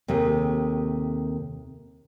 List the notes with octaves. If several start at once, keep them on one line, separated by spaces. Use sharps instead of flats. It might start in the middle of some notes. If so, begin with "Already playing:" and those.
D#2 C3 A3 G#4